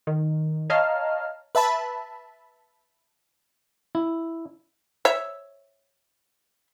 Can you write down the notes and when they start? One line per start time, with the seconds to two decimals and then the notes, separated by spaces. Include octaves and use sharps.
0.07 D#3
0.70 C#5 D#5 F5 A5 A#5 F6
1.55 B4 E5 A5 B5
3.95 E4
5.05 C#5 E5